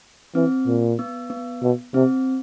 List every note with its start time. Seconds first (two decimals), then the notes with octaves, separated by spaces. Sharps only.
0.35 E3 C4
0.67 A#2
0.99 B3
1.30 B3
1.62 B2
1.94 C3 C4